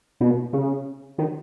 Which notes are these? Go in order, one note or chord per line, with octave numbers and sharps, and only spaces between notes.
B2
C#3
D#3